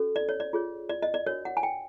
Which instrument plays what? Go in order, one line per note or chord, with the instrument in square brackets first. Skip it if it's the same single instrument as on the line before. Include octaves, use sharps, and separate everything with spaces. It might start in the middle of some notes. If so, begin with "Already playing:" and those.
Already playing: [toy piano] C#4 F#4 A4
D5
C#5
D5
F4 G#4 C#5
D5
D#5
D5
D4 F#4 A#4 C#5
F#5
G#5
G5